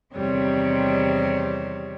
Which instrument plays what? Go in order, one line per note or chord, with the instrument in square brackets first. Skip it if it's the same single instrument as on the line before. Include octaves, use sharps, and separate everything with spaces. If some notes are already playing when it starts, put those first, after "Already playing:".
[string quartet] E2 C3 D#3 G3 C4 C#5